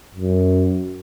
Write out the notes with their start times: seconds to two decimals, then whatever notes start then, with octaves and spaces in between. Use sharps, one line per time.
0.15 F#2